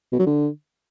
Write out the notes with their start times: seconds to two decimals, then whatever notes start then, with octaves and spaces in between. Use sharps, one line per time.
0.12 B2
0.19 F#3
0.26 D3